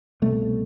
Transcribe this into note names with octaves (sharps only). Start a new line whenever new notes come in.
C2 B2 A3